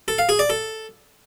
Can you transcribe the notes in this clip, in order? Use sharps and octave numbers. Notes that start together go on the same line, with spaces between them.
A4
F5
G#4
D5
A4